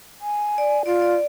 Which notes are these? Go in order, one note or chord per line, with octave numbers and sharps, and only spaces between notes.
G#5
D5
F4 D5
D5